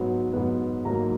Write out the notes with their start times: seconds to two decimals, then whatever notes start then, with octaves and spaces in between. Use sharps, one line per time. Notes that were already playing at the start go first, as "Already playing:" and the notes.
Already playing: G#2 F#3 B3
0.33 G#2 F#3 B3
0.85 G#2 F#3 A#3 A#5